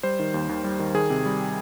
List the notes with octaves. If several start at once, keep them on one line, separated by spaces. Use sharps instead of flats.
G3 C5
D#3
D#2
D#2
G3
D#3
D#3 G#4
C3
G3